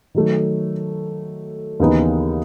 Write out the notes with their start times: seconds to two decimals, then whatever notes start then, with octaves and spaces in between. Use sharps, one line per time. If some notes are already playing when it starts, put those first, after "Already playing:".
0.15 D#3 F#3 A3
1.80 D#2 C#3 E3 B3 D#4